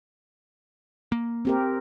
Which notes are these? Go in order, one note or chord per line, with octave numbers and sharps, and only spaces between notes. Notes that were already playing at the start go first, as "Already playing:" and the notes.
A#3
C4 G4 A#4